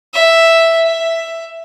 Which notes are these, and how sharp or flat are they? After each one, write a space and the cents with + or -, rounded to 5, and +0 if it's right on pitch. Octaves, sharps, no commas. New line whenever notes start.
E5 +0
E5 +10